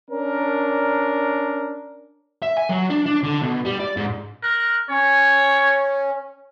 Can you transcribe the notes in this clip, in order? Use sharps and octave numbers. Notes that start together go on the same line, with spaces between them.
C#4 D4 A#4
E5
G#5
F#3
D4
D4
D3
B2
G3
D5
G#2
A#4 F#6
C#4 C#5